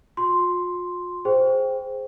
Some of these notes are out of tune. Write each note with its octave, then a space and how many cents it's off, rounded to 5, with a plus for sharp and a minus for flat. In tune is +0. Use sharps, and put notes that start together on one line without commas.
F4 +40 C6 +0
G#4 +0 C5 +0 G5 +0